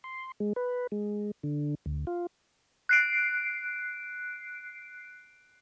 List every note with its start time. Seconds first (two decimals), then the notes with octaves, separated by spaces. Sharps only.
0.04 C6
0.40 G#3
0.56 B4
0.92 G#3
1.43 D3
1.86 D2
2.07 F4
2.89 F#6 C7 D7